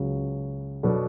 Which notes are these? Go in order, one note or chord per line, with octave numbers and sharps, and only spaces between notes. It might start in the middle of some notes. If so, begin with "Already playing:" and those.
Already playing: C#2 C#3 F#3
B2 F#3 B3 D4 A4